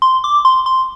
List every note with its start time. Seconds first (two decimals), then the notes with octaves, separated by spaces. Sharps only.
0.02 C6
0.24 D6
0.45 C6
0.66 C6